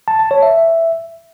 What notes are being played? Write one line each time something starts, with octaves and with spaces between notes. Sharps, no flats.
A5
A5
C#5
E5